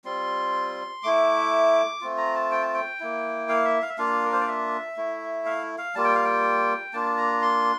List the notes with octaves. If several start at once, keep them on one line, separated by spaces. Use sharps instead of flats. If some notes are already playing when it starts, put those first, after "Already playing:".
G3 C4 F4 C6
A3 E4 D6
A3 C4 F4
A#5
A5
G5
A5
G5
A#3 E4
F5
E5
F5
E5
A#3 D4 F4 F5
A#4
C5
D5
E5
A3 E4
F5
F5
G3 A#3 F4 A5
G5
F5
G5
A#3 D4 F4 A5
A#5
C6